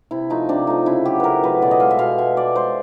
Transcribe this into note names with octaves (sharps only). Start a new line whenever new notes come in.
C3 E4
F3 A3 D#4
C3 D4
F3 A3 D#4
C#3 E4
F#3 A3 G4
C#3 A#4 B4
F#3 A3 B4
B2 D5
D#5
G#3 F5
E5
B2 F5
G#3 E5
B2 D5
G#3 C5